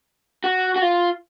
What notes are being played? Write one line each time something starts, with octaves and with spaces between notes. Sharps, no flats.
F#4
F#4
F4